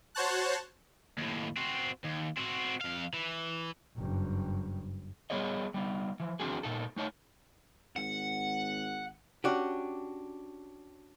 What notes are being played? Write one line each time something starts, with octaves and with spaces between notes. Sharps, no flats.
F#4 C5 C#5 A5 F#6
D#2 A2
C4 F#4
D#2
C4 F#4
F2 F5
E3
F#1 G2
G3 B3 G#4 C#5 D#5
G3 B3 D#4
E3 F3
E3 F#3 C4 D4 F#4 G#4
A#2 D#4 A4
A3 D#4 C#5 A5
G#1 F#5
C#4 D4 F#4 G4